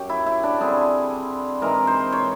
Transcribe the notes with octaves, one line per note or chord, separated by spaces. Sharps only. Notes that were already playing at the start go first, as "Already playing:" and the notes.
Already playing: F#2 G4
E4
E4
D4
D3 G3 C4 G#4
G#2 E3 G#3 C4 A#4
C5
C#5